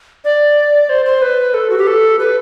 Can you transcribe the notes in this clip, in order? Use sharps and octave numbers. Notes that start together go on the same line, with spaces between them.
D5
C5
C5
B4
A4
F#4
G4
A4
B4